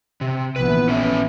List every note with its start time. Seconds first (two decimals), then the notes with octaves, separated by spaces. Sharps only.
0.21 C3
0.56 A#1 E3 B3 B4
0.88 C#4 B4 E5